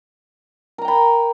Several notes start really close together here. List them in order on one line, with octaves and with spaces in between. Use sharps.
A#4 A#5 G5 B5